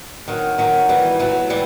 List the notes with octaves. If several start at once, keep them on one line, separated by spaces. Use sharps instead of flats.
D#3 F#3
D#3 F#3
E3 G3
F#3 A3
E3 G3